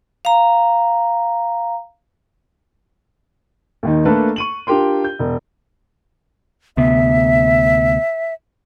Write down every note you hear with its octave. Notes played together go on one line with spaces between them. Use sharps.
F5 A#5
D#2 D#3 D#4
A3 A#3 D4 A4 B4
C#6 D#7 F#7
D4 F4 G4 A#4 G5 C6
G6
E1
D2 C3 B3 E5